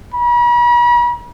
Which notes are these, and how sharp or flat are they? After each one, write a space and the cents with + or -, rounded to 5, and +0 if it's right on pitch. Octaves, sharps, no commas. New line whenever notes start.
B5 -45